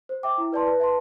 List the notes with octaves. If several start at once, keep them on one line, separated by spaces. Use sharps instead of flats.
C5
E5 G5 D6
E4
B4 D5 A5 C6
B4
E5 A5 C6